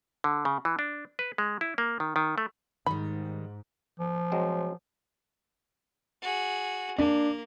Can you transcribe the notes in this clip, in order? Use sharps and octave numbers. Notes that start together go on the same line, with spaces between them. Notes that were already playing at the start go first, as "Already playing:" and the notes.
D3
C#3
E3
D4
B4
G#3
E4
A#3
D#3
D#3
A3
G#2 D#3 G3 B5
F3
F#3 G#3 C4
F#4 G#4
A#3 D4